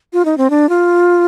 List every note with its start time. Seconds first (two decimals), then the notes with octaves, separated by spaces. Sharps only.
0.13 F4
0.25 D#4
0.38 C4
0.50 D4
0.69 F4